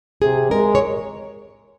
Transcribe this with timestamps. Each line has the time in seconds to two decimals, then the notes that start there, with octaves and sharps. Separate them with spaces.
0.22 C3 G#4
0.51 G#3 A#4
0.75 C#5